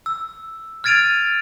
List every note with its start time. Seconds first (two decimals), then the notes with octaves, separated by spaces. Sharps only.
0.06 E6
0.84 F6 G#6 A6 D7 D#7 F7